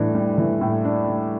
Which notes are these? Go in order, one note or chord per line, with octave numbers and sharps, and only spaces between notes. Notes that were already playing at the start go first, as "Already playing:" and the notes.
Already playing: A2 E3 G3 D4
G3
E3
A2
D4
G3